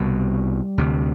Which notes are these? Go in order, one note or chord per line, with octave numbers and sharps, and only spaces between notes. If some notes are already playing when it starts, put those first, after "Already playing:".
Already playing: C2 B2 G3
D2 C3